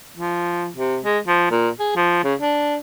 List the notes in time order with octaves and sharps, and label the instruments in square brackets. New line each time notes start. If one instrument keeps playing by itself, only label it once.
[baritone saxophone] F3
C3
G#3
F3
A#2
G#4
F3
C#3
D4